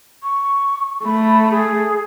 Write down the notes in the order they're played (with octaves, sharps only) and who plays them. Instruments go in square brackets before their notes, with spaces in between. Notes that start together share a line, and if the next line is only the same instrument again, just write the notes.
[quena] C#6
[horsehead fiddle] A3 [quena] B5
[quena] G#4